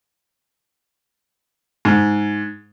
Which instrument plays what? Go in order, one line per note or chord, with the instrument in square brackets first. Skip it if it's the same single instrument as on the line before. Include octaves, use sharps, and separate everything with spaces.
[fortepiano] G#2